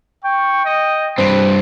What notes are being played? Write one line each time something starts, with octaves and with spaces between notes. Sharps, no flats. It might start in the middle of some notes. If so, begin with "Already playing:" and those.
G5 C#6
D#5
G2 C4 B4 C5